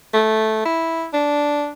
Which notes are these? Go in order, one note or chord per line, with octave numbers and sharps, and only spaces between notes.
A3
E4
D4